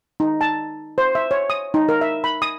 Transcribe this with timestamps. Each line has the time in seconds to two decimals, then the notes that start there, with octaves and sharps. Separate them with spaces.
0.20 D#4
0.41 A5
0.98 C5
1.15 E5
1.31 C#5
1.50 D#6
1.74 D#4
1.89 A#4
2.01 E5
2.24 B5
2.42 D#6